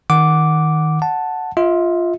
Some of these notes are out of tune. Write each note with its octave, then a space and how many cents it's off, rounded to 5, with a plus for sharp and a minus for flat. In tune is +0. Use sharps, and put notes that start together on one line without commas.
D#3 +10 F#5 +0 D6 -5
F#5 +0 A5 +0
F4 +0 E5 -40